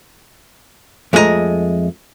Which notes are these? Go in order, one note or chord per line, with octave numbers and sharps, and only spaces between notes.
F2 G#3 A3 C4 D#5 A#5